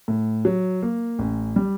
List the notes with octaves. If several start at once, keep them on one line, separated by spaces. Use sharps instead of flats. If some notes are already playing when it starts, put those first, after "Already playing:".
A2
F#3
A#3
A1
G3